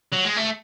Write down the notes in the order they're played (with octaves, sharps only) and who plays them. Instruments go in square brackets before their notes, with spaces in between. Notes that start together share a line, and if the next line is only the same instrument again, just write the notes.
[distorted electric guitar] F#3
G#3
A3